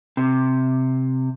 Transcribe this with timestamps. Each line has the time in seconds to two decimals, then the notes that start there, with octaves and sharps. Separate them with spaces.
0.17 C3